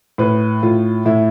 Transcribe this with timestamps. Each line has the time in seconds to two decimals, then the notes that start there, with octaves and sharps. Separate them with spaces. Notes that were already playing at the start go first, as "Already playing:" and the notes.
0.18 A2 B4
0.62 A2 F4
1.06 A2 E4